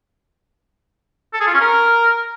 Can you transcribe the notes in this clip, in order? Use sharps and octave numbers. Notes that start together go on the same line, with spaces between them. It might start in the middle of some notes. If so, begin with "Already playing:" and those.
A4
G#4
F4
C#4
A#4